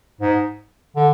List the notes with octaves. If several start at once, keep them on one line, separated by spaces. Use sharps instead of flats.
G#2
D3